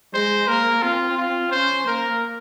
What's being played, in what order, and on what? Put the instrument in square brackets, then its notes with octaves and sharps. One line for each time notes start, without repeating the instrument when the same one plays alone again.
[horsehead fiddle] G#3 [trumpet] C5
[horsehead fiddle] A#3 [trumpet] A#4
[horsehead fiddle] C4 [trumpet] F4
[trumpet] F4
[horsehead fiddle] C#4 [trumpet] C5
[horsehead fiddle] A#3 [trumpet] A#4